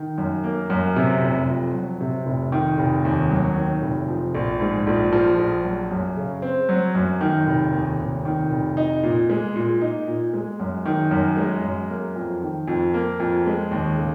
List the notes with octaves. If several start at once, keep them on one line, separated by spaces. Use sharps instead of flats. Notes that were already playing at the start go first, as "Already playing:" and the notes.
Already playing: D#3
F#2
A#3
F#2
C3
F1
F2
F#3
C3
F1
D#3
F1
D#2
F#3
D#3
F1
F3
A#1
G#2
A#1
F3
A#1
F#3
F#2
C#3
C4
F#3
F#2
D#3
F1
D#2
F1
D#3
F1
D#4
A#2
G#3
A#2
D#4
A#2
G#3
F#2
D#3
F#2
G#3
F#2
A#3
F2
D#3
F2
A#3
F2
G#3
D#2
C#3